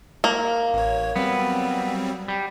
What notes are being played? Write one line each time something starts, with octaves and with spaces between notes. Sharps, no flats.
A#3
A1 C#5
F#3 G3 B3 C4
G3